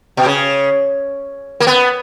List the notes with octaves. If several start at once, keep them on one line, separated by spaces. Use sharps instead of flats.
B2
C#3
A#3
B3